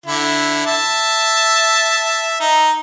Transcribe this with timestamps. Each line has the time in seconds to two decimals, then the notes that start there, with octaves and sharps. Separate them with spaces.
0.06 D3 E4
0.67 E5 A5
2.40 D#4